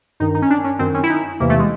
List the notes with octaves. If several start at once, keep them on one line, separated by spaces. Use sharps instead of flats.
G2 D#3 D#4
D#4
C#4
D4
C#4
F#2 D#3 C4
C#4
E4
D#4
E2 C3 E3 A#3
A3
G#3